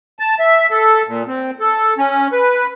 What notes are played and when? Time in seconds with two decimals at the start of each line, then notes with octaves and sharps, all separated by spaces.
0.19 A5
0.40 E5
0.71 A4
1.08 A#2
1.27 C4
1.60 A4
1.98 C#4
2.32 B4